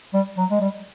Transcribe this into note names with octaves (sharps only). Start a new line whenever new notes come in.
G3
F#3
G#3
G3